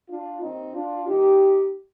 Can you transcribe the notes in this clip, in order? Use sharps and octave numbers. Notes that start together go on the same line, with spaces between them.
D4 F4
D#2 D#3 C4 D#4
D4 F4
G2 D#3 D#4 G4